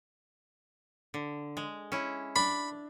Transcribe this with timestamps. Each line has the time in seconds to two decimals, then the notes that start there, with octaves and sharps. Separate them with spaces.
1.14 D3
1.57 G#3
1.92 C#4 E4
2.36 D4 B5